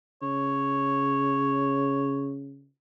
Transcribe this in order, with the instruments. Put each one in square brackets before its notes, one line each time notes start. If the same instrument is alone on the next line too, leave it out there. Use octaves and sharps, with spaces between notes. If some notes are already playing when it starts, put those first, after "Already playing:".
[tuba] C#3 [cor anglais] C#5